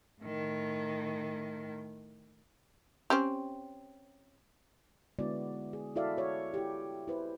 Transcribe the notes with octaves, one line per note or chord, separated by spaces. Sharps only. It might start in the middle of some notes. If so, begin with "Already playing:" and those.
A2 D#3
C4 C#4 G4
D3 G#3 B3 E4 F#4 D5
G#4
E4 F#4 A4 D5 E5 F5
F#4 C#5
E4 G4
E4 B4 C5